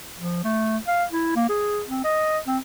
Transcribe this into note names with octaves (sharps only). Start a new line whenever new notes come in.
F3
A3
F5
E4
A#3
G#4
C4
D#5
C4